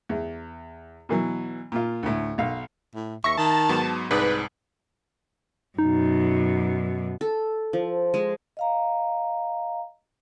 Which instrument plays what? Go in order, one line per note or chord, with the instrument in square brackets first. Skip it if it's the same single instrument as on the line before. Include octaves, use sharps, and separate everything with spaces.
[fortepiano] E2
B2 E3 F#3
A#2 F4
D2 A2
B1 F5
[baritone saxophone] A2
[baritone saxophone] D#2 [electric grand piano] E5 A#6 [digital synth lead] C#6
[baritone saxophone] D#3 [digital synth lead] A5
[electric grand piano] G#2 F#3 B3
[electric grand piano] C2 D5 D#6 [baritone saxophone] G#2 [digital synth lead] B4
[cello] F#2 B2 [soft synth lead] D#4
[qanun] A4
F3
G#3
[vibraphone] D#5 F5 A#5